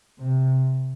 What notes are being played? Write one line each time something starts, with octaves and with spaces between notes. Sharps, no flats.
C3